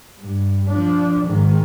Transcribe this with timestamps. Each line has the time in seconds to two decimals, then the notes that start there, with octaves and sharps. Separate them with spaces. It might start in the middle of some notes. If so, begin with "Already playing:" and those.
0.20 G2
0.68 F3 D4
1.26 G#2 D#3